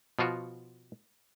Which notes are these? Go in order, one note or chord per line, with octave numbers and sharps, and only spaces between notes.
B2 F3 F4 F#4